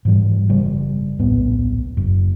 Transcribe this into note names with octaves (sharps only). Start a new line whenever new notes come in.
G#2 E3 G3
F#1 C#3 G3
D1 A#1 A2 B3
F#1 F#2